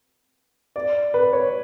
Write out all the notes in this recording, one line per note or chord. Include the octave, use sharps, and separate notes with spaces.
D5
B4
C#5